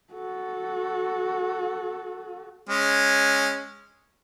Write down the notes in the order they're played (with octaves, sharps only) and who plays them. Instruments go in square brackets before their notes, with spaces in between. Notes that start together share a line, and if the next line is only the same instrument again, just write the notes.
[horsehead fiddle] F#4 A4
[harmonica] G#3 C#4